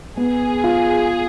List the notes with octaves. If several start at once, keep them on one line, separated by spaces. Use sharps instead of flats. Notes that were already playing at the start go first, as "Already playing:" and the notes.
B3 G#4
F4